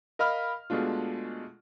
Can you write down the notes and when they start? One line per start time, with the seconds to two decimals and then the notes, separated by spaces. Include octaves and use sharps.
0.19 A#4 D#5 F5 B5 F6
0.70 B2 G#3 A3 D4 F4